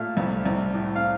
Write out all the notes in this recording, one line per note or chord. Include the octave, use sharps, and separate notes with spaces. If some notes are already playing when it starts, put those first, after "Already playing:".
Already playing: A#2 A3 F5
C2
C2
A2
F5